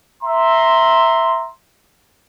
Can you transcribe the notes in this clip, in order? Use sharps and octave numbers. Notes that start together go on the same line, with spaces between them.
E5 A#5 C6